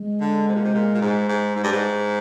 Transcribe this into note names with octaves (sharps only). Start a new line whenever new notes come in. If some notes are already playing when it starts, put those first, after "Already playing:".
Already playing: G#3
D3
C3
A#2
C3
A#2
A#2
G#2
G#2
G#2
G2
G#2